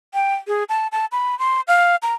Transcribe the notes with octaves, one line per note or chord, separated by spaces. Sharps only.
G5
G#4
A5
A5
B5
C6
F5
A#5